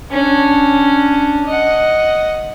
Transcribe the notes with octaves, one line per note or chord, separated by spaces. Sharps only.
C#4 D4
D#5 F#5